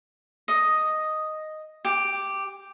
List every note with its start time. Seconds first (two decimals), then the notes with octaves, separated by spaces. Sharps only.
0.48 D#5
1.85 G4